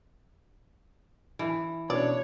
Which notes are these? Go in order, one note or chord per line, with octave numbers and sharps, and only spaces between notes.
E3
B2 C#4 D4 C#5 D5